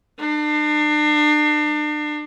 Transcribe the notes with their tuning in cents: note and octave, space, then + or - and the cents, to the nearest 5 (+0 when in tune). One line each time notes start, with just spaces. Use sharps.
D4 +35